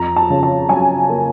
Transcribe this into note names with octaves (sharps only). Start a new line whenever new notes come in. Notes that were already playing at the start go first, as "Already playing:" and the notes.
Already playing: F2 A#5
A5
C#3
A5
F#3 G#5
A#3